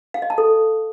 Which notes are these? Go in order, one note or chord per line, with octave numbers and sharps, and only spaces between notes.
F5
D#5
A5
A4